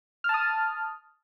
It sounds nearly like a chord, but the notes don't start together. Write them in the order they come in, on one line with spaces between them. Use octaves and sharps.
F6 A5 D#6